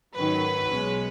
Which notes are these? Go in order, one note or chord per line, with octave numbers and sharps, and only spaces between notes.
G#2 D#3 F#3 C#4 B4
B1 B2 G#3 C#4